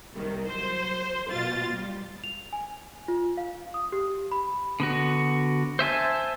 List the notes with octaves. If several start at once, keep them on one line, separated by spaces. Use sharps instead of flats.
C2 D#3
F#3 C5
B2 F4 A6
G3
F7
G#5
F4
F5
D#6
G4
B5
D3 B3 F#4
C5 E5 G#5 A5